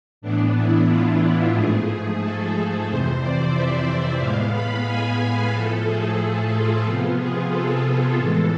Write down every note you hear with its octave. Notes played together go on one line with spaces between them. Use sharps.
A2 E3 B3 D4
E4
F4
G#2 F3 A3 G#4
A4
F2 C3 E3 C5
D5
E5
A2 G#3 B3 F5
B5
G#5
A2 F3 A3 A4
G#4
G#4
F4
C3 F3 B3 F4
G#4
A4
A2 E3 G#3 A4